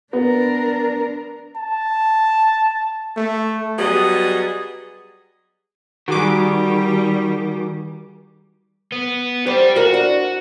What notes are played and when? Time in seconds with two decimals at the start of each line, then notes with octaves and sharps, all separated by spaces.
0.13 B3 D4 A#4
1.56 A5
3.17 A3
3.79 F#3 G3 B3 G#4 D#5
6.08 D#3 G3 F#4 G#4 D6
8.92 B3
9.47 G4 C5 D5
9.76 E3 F4 F#4 A#4
9.94 D4